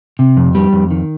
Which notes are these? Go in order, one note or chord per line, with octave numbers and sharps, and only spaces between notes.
C3
F2
G3
F2
D#3